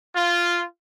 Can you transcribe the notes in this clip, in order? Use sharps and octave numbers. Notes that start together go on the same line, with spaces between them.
F4